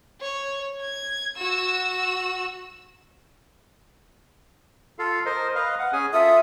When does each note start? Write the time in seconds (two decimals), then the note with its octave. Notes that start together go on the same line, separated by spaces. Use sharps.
0.21 C#5
0.81 G#6
1.37 F#4 E6
4.99 F4 A4 F5
5.26 A#4 C5 D#5
5.55 B4 D#5 F5
5.79 F#5
5.93 C#4 G#4 G#5
6.13 F4 A4 E5 D#6